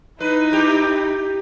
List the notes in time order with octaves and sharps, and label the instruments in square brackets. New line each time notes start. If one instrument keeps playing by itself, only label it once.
[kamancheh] D#4 E4 [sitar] B4
[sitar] G4